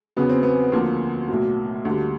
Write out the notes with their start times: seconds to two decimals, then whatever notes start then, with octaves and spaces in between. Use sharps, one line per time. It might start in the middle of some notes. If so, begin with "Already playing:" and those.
0.16 E2 C#3 F#3 B3
0.29 C4
0.43 B3
0.72 D2 D3 F3 A#3
1.28 B1 A2 F#3
1.85 D2 D3 G3